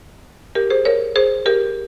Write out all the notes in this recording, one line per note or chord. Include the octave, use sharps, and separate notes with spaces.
G4 A#4
G#4 C5
A#4 C#5
G#4 C5
G4 A#4